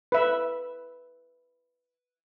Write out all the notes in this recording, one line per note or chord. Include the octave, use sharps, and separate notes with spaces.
B4 E5